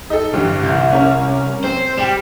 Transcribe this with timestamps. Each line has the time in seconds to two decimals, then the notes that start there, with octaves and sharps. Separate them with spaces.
0.10 D#4 A4
0.33 A1 G2 D3
0.62 C2
0.92 C#4 A#4
1.64 C4 C5
1.97 G3 G4 G5 E7